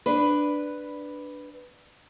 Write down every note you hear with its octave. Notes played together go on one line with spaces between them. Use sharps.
D4 B4